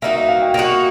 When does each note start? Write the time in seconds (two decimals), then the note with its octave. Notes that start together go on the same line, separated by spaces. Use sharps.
0.02 A#3 D#4 F#4 E5
0.16 E5
0.29 F5
0.42 G5
0.54 A#3 D#4 F#4